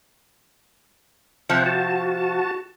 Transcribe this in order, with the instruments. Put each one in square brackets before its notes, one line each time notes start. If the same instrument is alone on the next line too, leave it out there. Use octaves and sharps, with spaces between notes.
[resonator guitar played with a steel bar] C3 F3 [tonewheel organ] C5 F#5
[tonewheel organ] F#4 A5